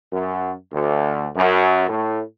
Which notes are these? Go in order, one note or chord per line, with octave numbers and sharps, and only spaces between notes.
F#2
D2
F#2
A2